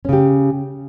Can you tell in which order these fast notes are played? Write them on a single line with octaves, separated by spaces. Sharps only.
C#4 C#3 G4